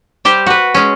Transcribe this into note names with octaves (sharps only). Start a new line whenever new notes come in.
G3 G4 C5
F#4 B4
G#3 C#4